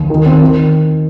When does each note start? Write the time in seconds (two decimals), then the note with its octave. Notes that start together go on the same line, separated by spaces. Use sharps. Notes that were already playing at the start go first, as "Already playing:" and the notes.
Already playing: D#2
0.10 D#3
0.26 C4
0.41 D#3